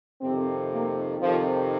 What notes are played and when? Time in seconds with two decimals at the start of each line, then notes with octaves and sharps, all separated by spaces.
0.21 F2 C3 D#3 C4
0.70 A#3
1.20 F2 C3 D#3 F3